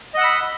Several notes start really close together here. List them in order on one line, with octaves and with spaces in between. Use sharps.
D#5 F#5 E6 B5